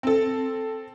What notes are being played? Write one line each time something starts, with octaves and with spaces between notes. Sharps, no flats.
C4 A4